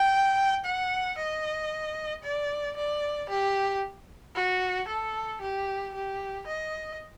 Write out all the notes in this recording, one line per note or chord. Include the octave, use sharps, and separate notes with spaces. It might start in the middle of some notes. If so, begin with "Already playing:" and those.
Already playing: G5
F#5
D#5
D5
D5
G4
F#4
A4
G4
G4
D#5